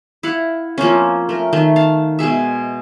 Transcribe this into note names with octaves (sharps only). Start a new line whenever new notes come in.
E4 F5 F#5
F3 A#3 C4 C#4
A3 A#4
D#3 A3
F5 A5
B2 G#3 G#4 E5